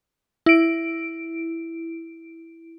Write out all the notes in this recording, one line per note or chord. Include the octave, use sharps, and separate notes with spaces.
E4 D7